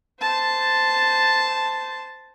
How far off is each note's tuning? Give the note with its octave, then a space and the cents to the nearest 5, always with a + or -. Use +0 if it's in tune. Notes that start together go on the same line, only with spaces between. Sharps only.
C5 -15 A5 +0